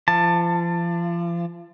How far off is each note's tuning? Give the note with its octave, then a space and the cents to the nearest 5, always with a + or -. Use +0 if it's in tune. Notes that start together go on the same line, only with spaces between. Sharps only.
F3 -35 A5 +15